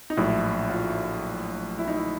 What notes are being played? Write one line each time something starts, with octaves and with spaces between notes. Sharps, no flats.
D#4
A#1 A2 F#3 E4
F4
E4
D#4
E4